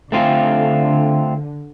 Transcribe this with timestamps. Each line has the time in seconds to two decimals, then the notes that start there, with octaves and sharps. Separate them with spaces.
0.12 D3 A3 C4 F4